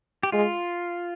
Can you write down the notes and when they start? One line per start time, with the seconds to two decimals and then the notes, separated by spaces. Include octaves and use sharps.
0.23 G4
0.32 G#3 F4